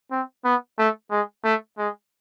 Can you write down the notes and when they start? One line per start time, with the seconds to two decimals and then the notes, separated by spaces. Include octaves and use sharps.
0.12 C4
0.45 B3
0.79 A3
1.11 G#3
1.44 A3
1.78 G#3